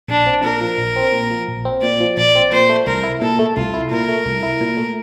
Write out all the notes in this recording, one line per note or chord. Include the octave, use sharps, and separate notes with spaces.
A#1 D4
C4
A#2 A#4
F3
A#1
C4
A#2
F3
A#1
C4
A#2 D5
F3
A#1 D5
C4
A#2 C5
A3
C2 A#4
E4
A#2 A4
A3
C2 F4
E4
A#2 A#4
A3
C2
E4
A#2
A3